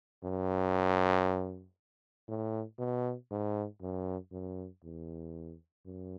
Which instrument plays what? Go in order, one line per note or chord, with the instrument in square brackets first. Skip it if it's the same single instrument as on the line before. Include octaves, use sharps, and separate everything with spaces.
[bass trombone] F#2
A2
B2
G#2
F#2
F#2
E2
F#2